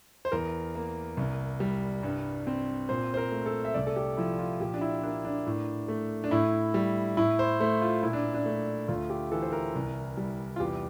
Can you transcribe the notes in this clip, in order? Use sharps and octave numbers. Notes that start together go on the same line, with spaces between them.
C5
E2 A#4
A#3
C2
G3
G2
C4
A#2 C5
C5
A#4
A3
A4
E5
C2 D5
A4
G4
F3 E4
F4
A#2 G4
D4
E4
A#3 D4
D4
A2
A3
D4
A2 E4
G3
A2 E4
C5
A3 C5
F4
A#2 E4
D4
D4
A3
D2 F4
G4
E3 A4
C5
A#4
C2
G3
F4
E2 G4